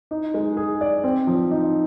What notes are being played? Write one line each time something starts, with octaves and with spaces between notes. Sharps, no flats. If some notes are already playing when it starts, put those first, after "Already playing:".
D#4
G#3
G#4
D5
C4
F3
D#4